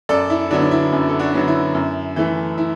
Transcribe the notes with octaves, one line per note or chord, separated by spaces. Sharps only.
F#2 A4 D5
E4
D3 F#3 B3 D4
D4
E4
F#2
A4
D4 F#4
D3 F#3 B3
E4
F#2
E3 A3
E4